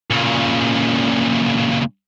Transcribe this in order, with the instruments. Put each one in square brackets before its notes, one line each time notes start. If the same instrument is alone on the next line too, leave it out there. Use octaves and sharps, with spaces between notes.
[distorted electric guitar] A#2 C#3